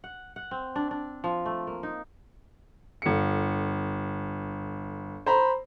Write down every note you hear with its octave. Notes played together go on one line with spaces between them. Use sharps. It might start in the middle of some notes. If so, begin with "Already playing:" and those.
F#5
F#5
C4
D4
D4
F3
A3
A#3
D#4
G1 C#7
C5 A#5 B5